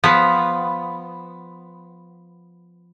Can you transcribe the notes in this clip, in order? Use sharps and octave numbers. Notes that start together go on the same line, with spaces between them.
F3 B3